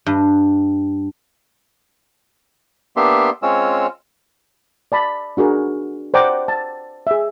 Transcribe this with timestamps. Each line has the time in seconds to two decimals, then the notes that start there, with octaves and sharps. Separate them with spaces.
0.06 G2
2.97 A#3 B3 D4 G4 E5 C6
3.43 G#3 C4 C#4 F4 C#5 E6
4.92 D5 A5 B5
5.37 D4 F#4 G#4 A#4
6.14 C5 D5 F#5 G5 A#5 D6
6.48 A5
7.07 G#4 E5